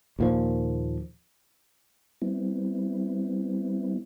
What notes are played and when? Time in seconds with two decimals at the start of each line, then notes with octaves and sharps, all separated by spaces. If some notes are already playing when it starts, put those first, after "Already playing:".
0.19 D#2 A#2 F3
2.22 G3 B3 C4 E4